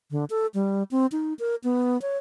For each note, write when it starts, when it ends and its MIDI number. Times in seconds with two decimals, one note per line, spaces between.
0.11 0.25 50
0.30 0.47 69
0.54 0.83 55
0.91 1.06 60
1.12 1.34 63
1.39 1.55 70
1.64 2.00 59
2.02 2.17 73